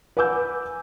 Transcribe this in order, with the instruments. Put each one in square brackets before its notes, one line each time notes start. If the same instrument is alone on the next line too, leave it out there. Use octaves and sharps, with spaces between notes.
[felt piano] B4 F#5 G#5 D6 E6 G6